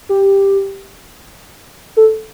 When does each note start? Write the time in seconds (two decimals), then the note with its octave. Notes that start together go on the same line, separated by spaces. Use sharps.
0.09 G4
1.97 A4